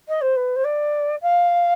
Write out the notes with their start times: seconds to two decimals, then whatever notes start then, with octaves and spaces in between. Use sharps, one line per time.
0.08 D#5
0.21 C5
0.37 B4
0.56 C5
0.64 D5
1.22 F5